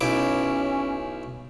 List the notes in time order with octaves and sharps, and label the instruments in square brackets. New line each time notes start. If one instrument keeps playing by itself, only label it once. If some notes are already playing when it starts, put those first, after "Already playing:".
[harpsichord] B1 E4 D6 [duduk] C#4